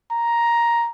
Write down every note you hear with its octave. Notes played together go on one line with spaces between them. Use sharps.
A#5